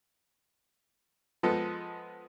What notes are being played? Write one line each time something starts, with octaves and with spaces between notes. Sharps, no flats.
F3 G#3 B3 A4